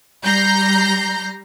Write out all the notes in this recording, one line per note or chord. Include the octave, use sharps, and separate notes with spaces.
G3 A#5 G6 A#6 C7